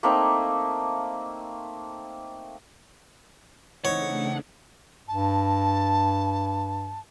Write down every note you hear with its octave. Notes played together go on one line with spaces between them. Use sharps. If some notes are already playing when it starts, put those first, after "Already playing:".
A3 A#3 C4 D#4
C#3 E3 A3 C4 D4 D#4 C#5 F#5
G2 A5